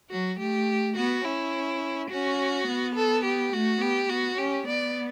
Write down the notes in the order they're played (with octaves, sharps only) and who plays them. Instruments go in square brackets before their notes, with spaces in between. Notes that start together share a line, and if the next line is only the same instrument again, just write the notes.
[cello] F#3 [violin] F#4
[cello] A3 [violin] G4
[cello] B3 [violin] F#4
[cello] C#4 [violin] E4
[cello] C#4 [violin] F#4
[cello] B3
[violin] A4
G4
[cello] A3 [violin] F#4
[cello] B3 [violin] G4
[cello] B3 [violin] F#4
[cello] C#4 [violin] G4
[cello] B3 [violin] D5